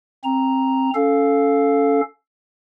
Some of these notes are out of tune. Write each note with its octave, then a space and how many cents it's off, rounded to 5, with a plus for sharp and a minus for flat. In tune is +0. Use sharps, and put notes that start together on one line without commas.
C4 +15 A#5 +0
C#4 +15 A4 +0 F5 +0